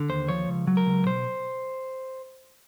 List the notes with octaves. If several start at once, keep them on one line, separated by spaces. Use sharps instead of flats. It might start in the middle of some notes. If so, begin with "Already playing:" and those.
Already playing: D3
D#2 C5
F3 C#5
C#2
F#3
A#4
C#2
B2 C5